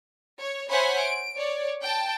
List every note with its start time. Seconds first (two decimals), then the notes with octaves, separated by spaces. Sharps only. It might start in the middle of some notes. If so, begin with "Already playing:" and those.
0.40 C#5
0.69 C5 C#5 E5 F#5 G#5 B5
1.00 D7
1.37 C#5 D5
1.82 G5 A5